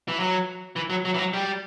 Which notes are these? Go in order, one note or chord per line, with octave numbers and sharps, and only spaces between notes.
E3
F#3
E3
F#3
F#3
E3
F#3
G3